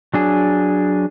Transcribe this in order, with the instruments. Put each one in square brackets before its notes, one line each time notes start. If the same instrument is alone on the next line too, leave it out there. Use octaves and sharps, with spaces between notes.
[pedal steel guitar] F#3 D4 G#4